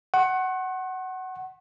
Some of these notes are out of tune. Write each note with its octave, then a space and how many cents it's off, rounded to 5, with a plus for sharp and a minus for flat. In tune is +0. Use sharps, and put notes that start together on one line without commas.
F#5 +15 C#6 -45